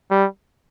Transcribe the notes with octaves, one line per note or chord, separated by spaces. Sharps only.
G3